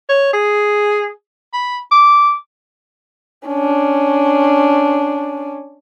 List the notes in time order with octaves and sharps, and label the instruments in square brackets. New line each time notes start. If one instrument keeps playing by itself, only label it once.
[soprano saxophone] C#5
G#4
B5
D6
[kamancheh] C#4 D4